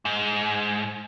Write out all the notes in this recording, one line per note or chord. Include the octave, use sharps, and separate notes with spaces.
G#2